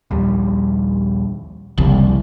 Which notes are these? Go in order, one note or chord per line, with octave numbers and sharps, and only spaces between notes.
A#1 D#2 G3
F#1 C2 C#3 F3 G3